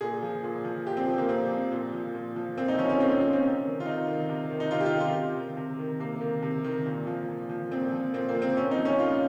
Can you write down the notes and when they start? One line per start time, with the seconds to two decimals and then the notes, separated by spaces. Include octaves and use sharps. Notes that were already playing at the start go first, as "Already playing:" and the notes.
0.01 A#2 G#4
0.22 F3
0.44 A#2
0.65 F3
0.86 A#2 G4
0.97 C4
1.08 F3
1.18 A#3
1.29 A#2 C4
1.50 F3
1.72 A#2
1.94 F3
2.15 A#2
2.36 F3
2.57 A#2 C4
2.68 D#4
2.79 F3 C#4
2.89 C#4
3.00 A#2 C4
3.11 C4
3.21 F3 C4
3.33 C4
3.43 C3
3.64 D#3
3.80 F4
3.85 C3 D#4
4.07 D#3
4.29 C3
4.50 D#3
4.60 D#4
4.71 C3 F4
4.80 G4
4.86 F4
4.93 D#3
5.00 F4
5.14 C3
5.36 D#3
5.57 C3
5.79 D#3
6.00 C3 A#3
6.21 D#3
6.42 C3
6.64 D#3
6.86 A#2
7.07 F3
7.28 A#2
7.49 F3
7.71 A#2 C4
7.92 F3
8.14 A#2 C4
8.29 A#3
8.35 F3
8.42 C4
8.56 A#2 C#4
8.71 D#4
8.78 F3
8.85 C#4
8.99 A#2 F4